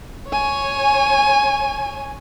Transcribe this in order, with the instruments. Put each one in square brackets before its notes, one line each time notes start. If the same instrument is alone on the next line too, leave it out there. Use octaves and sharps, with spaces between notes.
[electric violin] C#5 G#5